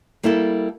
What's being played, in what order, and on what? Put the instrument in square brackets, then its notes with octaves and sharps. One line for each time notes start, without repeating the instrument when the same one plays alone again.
[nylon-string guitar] G3 A#3 E4 A4